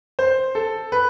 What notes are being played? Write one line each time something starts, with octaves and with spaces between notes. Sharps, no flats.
C5
A4
B4